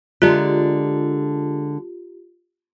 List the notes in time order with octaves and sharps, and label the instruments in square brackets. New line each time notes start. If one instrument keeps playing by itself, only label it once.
[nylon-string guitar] D3 G#3 D4 [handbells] F4 G4